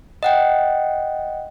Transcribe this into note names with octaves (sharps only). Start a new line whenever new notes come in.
D#5 F#5 G5